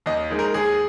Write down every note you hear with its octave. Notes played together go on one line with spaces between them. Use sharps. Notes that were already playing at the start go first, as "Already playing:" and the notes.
D#2 D#5
D#3 G#3 D#4
A#4
D#2 G#4